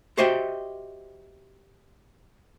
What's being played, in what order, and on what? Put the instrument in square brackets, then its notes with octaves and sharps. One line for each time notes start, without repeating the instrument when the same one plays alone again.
[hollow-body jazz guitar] F#4 G4 C5 D#5 E5 G5